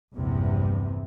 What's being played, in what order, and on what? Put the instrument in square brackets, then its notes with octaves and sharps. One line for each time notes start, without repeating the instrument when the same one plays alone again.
[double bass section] A#1 E2 G2 C3